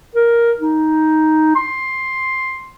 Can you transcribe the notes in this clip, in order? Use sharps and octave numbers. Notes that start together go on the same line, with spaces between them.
A#4
D#4
C6